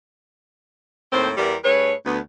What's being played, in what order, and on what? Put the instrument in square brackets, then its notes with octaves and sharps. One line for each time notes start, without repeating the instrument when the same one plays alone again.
[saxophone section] D#2 A2 A3 C4 A#4 C5
E2 G3 A#4
G2 A3 G#4 B4 C#5
D2 B3